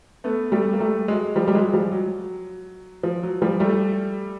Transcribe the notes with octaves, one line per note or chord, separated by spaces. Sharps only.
A3 B3
G3 A3
A#3
G3 A3
F#3 G#3
F3 G3
G3
F#3 G#3
F3 G3
F#3
F3
F#3
F3 G3
G3 A3